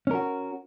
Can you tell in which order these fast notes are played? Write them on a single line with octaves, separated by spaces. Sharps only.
C#4 A#4 F#4